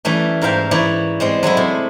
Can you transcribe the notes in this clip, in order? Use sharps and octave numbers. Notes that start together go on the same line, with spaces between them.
E3 G3 A3 C#4
G#2 A#4 E5 F5 G5
E3 E4 C#5 D5
G3 G#3 C4
F#3 G#3 A3 E4
C3